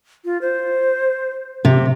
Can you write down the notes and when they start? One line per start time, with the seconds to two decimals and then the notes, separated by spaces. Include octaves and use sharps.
0.25 F4
0.41 C5
1.65 C3 G4